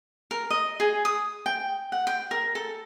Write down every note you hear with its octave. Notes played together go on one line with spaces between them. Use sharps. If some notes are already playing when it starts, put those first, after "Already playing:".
A#4
D#5
G#4
D#6
G5
F#5
G5
A#4
A4